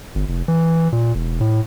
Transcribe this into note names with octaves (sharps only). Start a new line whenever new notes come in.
G1
F1
E3
A#2
E1
A2